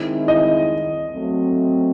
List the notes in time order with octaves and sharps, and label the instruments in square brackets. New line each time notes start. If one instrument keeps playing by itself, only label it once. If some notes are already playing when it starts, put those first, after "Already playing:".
Already playing: [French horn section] D#3 G#3 C4 E4
[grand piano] D#5
[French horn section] F#3 A3 C4